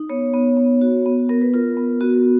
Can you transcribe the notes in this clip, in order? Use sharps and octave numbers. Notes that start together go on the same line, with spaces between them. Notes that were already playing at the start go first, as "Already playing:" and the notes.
Already playing: D#4
B3 C#5
B3
B3
F#4
B3
B3 A#4
B4
F4 A#4
B3
B3 F#4